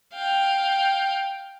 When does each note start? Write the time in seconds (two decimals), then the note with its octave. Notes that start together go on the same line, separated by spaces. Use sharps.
0.13 F5 G5